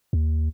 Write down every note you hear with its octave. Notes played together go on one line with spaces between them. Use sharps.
D#2